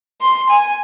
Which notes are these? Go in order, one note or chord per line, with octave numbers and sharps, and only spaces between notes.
C6
G#5